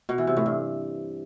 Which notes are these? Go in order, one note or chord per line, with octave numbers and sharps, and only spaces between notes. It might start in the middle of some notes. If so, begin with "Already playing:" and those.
B2
E3
C3
A2
G2